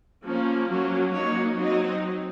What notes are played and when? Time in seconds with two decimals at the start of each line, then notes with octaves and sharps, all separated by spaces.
0.24 F3 A#3 C#4
0.69 F#3 A#3 C#4
1.13 F#3 A#3 D#4 C#5
1.58 F#3 C4 D#4 D#5